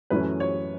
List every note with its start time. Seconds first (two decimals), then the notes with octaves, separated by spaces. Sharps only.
0.10 F#2 E3 A3 C#4 B4
0.40 C#5